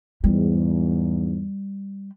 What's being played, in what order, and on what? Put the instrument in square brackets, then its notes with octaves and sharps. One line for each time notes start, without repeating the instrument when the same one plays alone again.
[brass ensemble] E2 G#2 [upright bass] G3